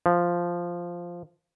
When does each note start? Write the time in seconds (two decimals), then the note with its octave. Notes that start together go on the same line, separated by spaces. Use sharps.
0.06 F3